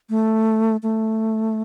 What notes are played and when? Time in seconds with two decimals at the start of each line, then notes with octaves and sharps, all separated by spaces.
0.10 A3
0.83 A3